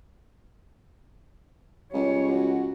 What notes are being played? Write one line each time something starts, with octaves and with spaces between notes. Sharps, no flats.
C#2 G3 C#5
F#4